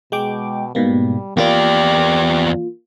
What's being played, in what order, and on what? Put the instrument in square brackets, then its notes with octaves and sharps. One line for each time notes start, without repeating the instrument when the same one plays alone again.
[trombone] B2 [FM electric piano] G#3 G5 D6
[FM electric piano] G#2 B2 A#3 [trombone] G3
[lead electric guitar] E2 D5 [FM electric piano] A#3 F4 [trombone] G4